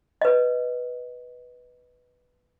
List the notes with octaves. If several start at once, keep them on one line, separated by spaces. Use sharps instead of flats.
B4 D#5